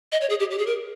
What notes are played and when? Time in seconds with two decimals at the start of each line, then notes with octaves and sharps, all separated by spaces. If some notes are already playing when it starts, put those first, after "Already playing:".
0.12 D#5
0.21 C#5
0.30 G#4
0.40 G4
0.51 G4
0.58 G#4
0.66 A#4